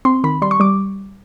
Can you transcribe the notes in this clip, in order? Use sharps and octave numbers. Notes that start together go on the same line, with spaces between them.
C4 C6
D#3 B5
G3 C6
C#6
G3 D6